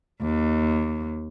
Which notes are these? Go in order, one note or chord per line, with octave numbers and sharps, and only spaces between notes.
D#2